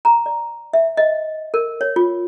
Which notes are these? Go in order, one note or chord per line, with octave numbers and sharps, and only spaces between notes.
A#5
D5
E5
D#5
A#4
C#5
F4